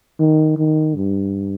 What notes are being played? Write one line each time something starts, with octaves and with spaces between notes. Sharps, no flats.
D#3
D#3
G2